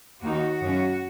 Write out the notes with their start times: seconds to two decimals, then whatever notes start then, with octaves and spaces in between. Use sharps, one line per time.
0.22 D#2 D#3 A#3 D#4 F#4
0.61 F#2 C#3 F#3 C#4